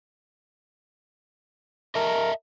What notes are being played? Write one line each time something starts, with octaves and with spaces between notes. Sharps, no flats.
A#4 D#5 E5 A5